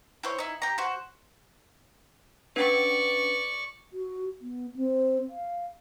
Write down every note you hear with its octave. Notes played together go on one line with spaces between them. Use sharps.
E4 C5 C#5
D#4 E4
G4 A#5
F#4 C5
C#4 D4 B4 D5 C#6
F#4
B3
C4
F5